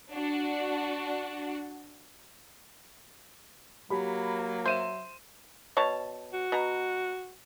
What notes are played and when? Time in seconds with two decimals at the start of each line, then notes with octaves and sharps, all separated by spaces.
0.12 D4 F#4
3.90 F#3 A#3 G4 B5
4.66 C5 E5 D#7 E7
5.77 B2 C#5 A5
6.33 F#4
6.52 B2 A#5